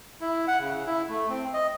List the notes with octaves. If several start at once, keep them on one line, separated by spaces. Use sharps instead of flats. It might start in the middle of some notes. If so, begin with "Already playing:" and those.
E4
F#5
C#3
E4
A3
C4
D#5